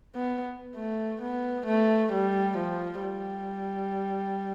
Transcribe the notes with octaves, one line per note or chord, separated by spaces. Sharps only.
B3
A3
B3
A3
G3
F3
G3